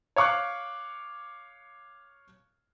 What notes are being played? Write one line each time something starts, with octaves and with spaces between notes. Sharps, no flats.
C#5 F5 C#6 D6 F#6